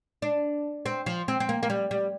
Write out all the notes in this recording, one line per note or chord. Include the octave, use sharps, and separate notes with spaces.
D4
C4
F3
C4
C4
A#3
A#3
G3
G3